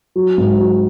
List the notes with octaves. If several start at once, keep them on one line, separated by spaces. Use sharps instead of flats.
F#3
G#2
F#3